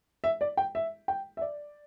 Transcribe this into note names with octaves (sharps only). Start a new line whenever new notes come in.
E5
D5
G5
E5
G5
E5
D5